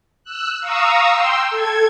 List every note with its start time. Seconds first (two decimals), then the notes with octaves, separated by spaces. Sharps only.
0.24 E6 F#6
0.60 F5 A#5 C#6 D#6 E6
1.13 G5 C6 E6
1.50 A4 G#6